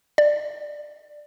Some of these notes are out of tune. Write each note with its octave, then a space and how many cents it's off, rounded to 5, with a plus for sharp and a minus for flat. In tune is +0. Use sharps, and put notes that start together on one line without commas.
D5 +10